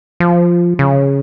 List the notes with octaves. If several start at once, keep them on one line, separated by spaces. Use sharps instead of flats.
F3
C#3